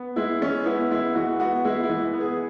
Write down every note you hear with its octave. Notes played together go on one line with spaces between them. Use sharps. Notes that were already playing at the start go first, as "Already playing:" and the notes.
Already playing: B3
G#3 E4
E3 C#4
B3 E4
G#3 E4
E3 F#4
B3 F#4
G#3 E4
E4
E3
B3
G#4